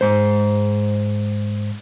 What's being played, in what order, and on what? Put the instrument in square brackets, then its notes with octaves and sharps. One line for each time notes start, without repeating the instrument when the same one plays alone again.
[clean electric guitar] G#2 C5